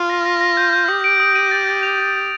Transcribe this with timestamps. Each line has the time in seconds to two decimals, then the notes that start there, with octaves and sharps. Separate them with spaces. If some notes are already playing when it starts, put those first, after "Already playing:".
Already playing: F4 F6
0.10 A#6
0.25 A#6
0.41 A#6
0.57 G6
0.73 G6
0.88 G4 D#6
1.04 D7
1.20 D#6
1.35 D#7
1.51 A6
1.67 A6
1.83 F7